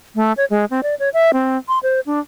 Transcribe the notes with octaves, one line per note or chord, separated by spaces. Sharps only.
A3
C#5
G#3
C4
D5
C#5
E5
C4
C6
C5
D4